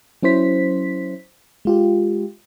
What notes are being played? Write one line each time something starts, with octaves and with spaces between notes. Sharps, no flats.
F#3 C#4 E4 C5 B6
G#3 F4 G4